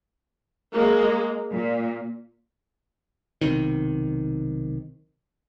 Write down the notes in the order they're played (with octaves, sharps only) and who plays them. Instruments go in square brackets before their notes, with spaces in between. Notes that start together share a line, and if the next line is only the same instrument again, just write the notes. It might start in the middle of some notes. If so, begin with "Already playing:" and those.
[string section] G#3 A#3
A#2
[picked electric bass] B1 C3 D#3